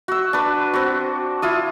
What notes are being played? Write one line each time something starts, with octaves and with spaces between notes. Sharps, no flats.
F#4 E6
D4 B4
C4 F#4
E4 F4 D#6